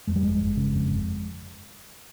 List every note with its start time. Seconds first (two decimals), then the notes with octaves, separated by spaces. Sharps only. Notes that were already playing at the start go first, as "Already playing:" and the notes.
0.07 F2 G#3
0.16 G3
0.23 G1 G#3
0.41 G1
0.57 C#3
0.74 F2
0.90 G1